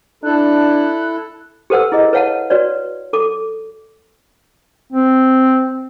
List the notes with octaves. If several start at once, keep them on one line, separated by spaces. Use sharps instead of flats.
D4 E4 A4 F#6
G4 A4 B4 C5 F#5 E6
E4 G#4 D#5
B4 C#5 F5 F#5 A5
F#4 B4 C#5 D5
A4 D6
C4